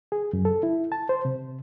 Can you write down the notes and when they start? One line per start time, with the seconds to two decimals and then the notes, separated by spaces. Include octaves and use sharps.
0.12 G#4
0.33 F#2
0.45 A4
0.63 E4
0.92 A5
1.09 C5
1.25 C3